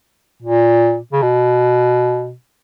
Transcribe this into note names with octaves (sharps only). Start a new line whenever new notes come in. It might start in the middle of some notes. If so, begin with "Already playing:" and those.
A#2
C#3
B2